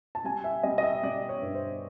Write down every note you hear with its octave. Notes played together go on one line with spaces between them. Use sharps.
A5
G3 G#5
E5
G3 D#5
D#5
E5
G3 D5
C#5
G2
C5